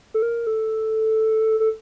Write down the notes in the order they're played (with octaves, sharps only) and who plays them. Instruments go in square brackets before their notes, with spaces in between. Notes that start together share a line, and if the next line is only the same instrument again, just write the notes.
[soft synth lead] A4
A#4
A4
A4